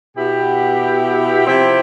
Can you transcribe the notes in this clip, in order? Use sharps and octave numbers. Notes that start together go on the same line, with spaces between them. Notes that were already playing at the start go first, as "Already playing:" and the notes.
B2 B3 E4 G4
C3 F3 C4 E4 G4